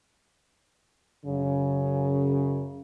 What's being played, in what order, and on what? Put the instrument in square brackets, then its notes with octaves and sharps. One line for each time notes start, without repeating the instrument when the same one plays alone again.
[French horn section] F#2 C#3